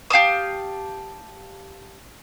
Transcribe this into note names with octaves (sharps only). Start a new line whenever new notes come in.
G4 F5 A5 D#6